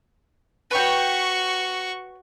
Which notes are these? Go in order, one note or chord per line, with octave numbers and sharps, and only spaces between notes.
F#4 B4 C#5 G5 C#6